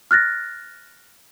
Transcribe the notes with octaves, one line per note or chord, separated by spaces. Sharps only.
F6 F#6 A6 A#6